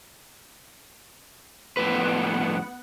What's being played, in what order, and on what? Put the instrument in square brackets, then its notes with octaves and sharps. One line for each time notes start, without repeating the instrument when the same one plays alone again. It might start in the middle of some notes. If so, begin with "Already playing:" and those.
[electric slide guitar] F2 A2 B4 [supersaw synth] B3 F#5